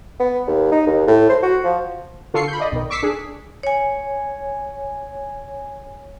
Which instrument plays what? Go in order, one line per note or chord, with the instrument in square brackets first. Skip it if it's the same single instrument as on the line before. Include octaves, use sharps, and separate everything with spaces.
[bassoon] B3
D#2
D#4
D#2
A2
C5
F#4
F3
[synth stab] D3 F4 A4 C#6 C7 C#7
B5 G6
D5 D#5
B1 D#3
C#6 D6 E6 B6 C7
D4 G#4
[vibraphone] C#5 G#5